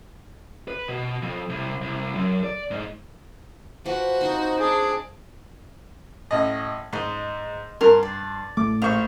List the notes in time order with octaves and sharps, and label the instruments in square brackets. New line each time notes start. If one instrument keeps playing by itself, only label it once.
[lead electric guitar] B4
B2
F2
C2
C2
F#2
D5
G#2
[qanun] F3 B4 [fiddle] F#4
[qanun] C4 C6 C#6 [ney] D#4
[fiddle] G#3 D4 [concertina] G#4
[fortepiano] A1 D#5
[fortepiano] G#2 [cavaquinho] D#5 C6
[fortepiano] G2 C6 [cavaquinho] A#4
[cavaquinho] D5
[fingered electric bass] A1 A3 [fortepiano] D6
[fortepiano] A#1 C5 C#6 [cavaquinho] F5 B5